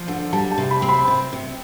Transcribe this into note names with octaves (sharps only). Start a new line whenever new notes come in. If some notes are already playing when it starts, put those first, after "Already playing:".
Already playing: F3
D3
G3 A5
A5
C3
B5
C4
B5
C3
C3